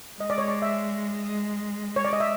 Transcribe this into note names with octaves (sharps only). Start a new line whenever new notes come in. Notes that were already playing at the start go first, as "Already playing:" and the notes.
G#3 D#5
D5
C#5
D5
E5
C#5
D5
D#5
E5